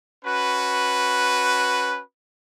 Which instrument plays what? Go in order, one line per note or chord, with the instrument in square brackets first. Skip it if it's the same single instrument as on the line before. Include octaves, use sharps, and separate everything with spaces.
[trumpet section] C#4 F#4 B4